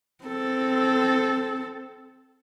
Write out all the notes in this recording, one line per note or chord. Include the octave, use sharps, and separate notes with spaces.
C4 A4